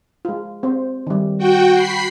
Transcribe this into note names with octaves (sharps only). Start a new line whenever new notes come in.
G#3 F4
C4 C5
D#3 G3
F#4 G5
B5 C7